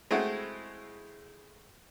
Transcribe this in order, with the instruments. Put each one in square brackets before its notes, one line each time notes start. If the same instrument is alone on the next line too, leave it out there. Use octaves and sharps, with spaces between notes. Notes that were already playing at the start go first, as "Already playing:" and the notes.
[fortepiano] G#3 A3 C4 E4 F#4